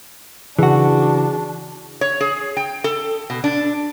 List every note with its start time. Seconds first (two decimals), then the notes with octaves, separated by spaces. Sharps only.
0.59 C#3 E3 D4 F#4 G#4
2.01 C#5
2.21 G#4
2.57 G5
2.84 A4
3.30 B2
3.44 D4